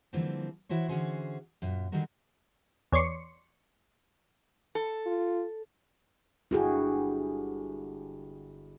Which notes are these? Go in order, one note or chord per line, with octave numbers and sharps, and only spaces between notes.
D3 E3 F3 G3 A#3 C4
E3 E4 F#4 C5 C#5
D3 E3 C#4 F#4 G#4 C5
F#2 A#2
D3 D#3 F#3 G3 F#4 A#4
E2 C#5 D5 C6 C#7
A4
F4
G1 D3 E4 F#4 G#4 G5